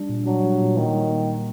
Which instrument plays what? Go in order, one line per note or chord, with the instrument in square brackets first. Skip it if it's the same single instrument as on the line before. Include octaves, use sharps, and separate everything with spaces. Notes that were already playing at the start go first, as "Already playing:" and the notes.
Already playing: [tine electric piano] G3 D4
A#2
[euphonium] F#3 [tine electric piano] D4
[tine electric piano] G3
A#2
[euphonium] D#3 [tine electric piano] A#3
[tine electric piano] G3
A#3